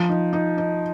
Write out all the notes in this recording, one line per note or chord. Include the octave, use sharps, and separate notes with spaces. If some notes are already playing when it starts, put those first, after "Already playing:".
Already playing: F3
D#4
D#4
D#4